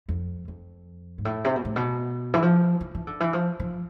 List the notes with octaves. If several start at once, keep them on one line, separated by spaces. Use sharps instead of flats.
F2
F2
G#2
A2
C3
B2
A2
B2
E3
F3
E3
E3
D3
E3
F3
F3